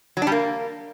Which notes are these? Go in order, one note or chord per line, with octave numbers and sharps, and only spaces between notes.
F#3
D4
G3
A#3